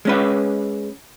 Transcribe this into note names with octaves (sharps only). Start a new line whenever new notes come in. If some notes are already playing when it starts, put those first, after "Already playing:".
G#3 C#4 B4